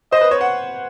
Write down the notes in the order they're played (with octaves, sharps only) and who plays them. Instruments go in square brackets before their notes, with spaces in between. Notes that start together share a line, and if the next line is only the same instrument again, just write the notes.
[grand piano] C5 [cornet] D#5
[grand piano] B4
C#5
F#5